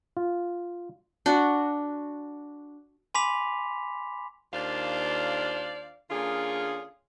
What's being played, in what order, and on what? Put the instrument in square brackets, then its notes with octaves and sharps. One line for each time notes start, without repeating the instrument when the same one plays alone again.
[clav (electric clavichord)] F4
[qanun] D4 F#4
[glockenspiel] G#5 B5 C6 D6 B6 F7
[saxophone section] D#2 D4 F4 C5 D5 F5
D3 A#3 C#4 F4 G#4